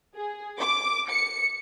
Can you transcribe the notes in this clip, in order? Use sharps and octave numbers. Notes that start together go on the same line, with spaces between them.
G#4
D6
C#7